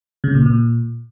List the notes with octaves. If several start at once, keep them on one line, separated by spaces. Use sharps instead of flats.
C#3
A#2
A#2